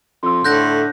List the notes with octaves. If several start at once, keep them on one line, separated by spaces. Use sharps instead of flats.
F2 C6 E6
A2 D3 F#6 G6 A#6